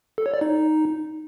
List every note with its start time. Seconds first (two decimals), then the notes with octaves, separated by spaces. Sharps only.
0.18 A4
0.26 C#5
0.34 D5
0.41 D#4